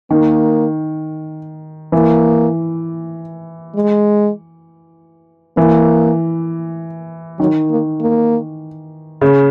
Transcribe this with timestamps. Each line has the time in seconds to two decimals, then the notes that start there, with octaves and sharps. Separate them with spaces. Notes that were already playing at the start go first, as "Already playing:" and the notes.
0.11 D#3 A#3
1.92 E3 A#3
3.75 G#3
5.57 E3 A#3
7.39 D#3 F#3
7.70 A#3
8.01 A#3
9.21 C#3